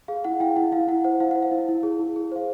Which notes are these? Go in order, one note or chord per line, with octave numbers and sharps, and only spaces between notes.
G#4 F5
E4 F#5
E4 F5 G5
E4 F#5
E4 F5
E4 F#5
C5 F#5
E4 F5
C5 F#5
F5
E4
E4
G#4
E4
G#4
C5 F5